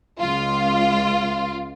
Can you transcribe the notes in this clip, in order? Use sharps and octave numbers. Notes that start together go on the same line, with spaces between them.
C#2 F4